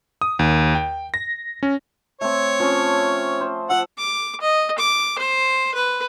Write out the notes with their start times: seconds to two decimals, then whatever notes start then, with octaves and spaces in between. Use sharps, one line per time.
0.21 D#6
0.39 D#2
0.75 G5
1.14 A#6
1.63 C#4
2.21 A3 C4 C#5
2.60 F3 C4 C#4
3.41 C5
3.70 F3 E5 F#5
3.98 D6
4.41 D#5
4.79 D6
5.19 C5
5.75 B4